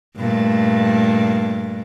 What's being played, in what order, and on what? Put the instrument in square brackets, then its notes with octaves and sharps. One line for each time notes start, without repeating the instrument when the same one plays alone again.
[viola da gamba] G2 A#2 A3